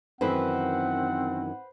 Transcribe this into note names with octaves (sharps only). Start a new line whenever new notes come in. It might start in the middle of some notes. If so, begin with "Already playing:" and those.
F#2 D#3 E3 C4 B4 C5 F#5